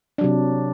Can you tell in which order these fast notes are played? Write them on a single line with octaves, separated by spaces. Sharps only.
D4 F#3 C3